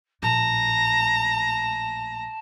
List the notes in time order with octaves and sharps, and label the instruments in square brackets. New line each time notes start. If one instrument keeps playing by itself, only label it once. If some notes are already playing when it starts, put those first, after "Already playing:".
[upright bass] A#1 A2 [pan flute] A5 [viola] A#5